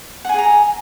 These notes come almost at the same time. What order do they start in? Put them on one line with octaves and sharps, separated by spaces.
F#5 G#5 G#4 A#5